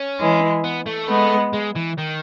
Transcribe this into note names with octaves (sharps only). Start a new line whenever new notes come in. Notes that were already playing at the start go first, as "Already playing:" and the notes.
Already playing: C#4
E3 G#3
B3
A3
G#3 B3
G#3
E3
D#3